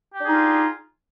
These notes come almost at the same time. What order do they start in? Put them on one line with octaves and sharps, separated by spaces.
G4 D4 G#4 D#4 F4